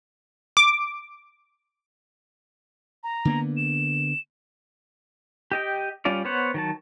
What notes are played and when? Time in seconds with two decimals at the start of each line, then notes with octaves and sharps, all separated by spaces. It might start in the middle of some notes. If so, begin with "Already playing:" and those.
0.57 D6
3.03 A#5
3.25 D3 A#3 B3
3.57 E7
5.52 G4 D#5 G5
6.05 G3 C#4 F4 D5
6.25 B3 C5 C#5 F#5
6.54 D#3 F#3 A5